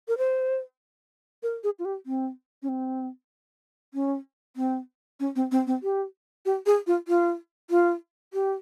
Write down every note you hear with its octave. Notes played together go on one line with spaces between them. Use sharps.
A#4
C5
A#4
G#4
F4
G4
C4
C#4
C4
C#4
C4
C#4
C4
C4
C4
G4
G4
G#4
F4
F4
F4
G4